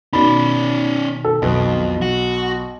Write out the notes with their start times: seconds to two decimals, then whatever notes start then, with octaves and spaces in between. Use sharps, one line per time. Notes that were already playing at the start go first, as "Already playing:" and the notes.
0.13 B2 D#3 C#4 D5 B5
1.25 A4
1.42 B1 F2 B4
2.02 F#4